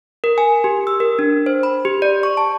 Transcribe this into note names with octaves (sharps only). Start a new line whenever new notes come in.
A#4
G#5
G4
E6
A#4
D4
C5
B5
G4
D5
C#6
A5